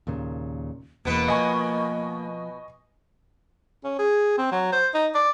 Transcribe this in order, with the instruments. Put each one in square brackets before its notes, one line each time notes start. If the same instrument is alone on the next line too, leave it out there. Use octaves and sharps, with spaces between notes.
[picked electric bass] D#2 A#2 C#3
[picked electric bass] E1 E2 [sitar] B2 B3 B4 [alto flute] A#3
[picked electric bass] F3 [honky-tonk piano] D#5 G#5 C#6
[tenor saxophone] C#4
G#4
C4
F#3
C5
D#4
D5